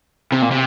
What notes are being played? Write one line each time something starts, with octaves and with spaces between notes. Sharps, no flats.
C3
A#2
C3